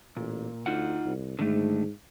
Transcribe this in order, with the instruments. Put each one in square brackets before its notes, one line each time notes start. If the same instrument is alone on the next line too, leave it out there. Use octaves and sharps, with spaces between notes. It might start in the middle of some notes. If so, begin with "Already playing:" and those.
[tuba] A1 [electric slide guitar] A#2
[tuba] D2 [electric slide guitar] D#4 F4 F#5
[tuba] C2
[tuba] G#2 [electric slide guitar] D3 D#3 A3